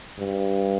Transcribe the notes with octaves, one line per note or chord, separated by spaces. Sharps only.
G2